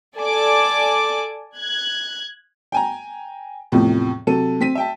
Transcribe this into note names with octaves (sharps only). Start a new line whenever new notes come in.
A4 D5 G#5 A5 D6
F#6 G#6
G5 G#5 A#5
E2 A2 C3 F3
C3 F#3 A4 D#7
C4 B6 D#7
E5 G5 A5